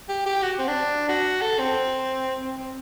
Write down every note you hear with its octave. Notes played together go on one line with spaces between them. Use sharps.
G4
G4
F#4
C4
D4
F#4
A4
C4
C4
C4